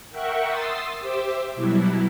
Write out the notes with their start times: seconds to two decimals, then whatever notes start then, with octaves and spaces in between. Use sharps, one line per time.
0.11 A#4 E5 F#5 G5 C#6
0.47 C6 D#6 E6 A6 C7
1.00 G4 C5 E5 D6 E6
1.55 B2 F#3 G3 E4